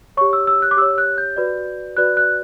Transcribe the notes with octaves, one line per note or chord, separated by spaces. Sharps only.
G4 C#5 C#6
E6
E6
F#6
D6
G4 C#5 E6
F#6
G6
F#4 B4 D5
F#4 B4 D5 F#6
F#6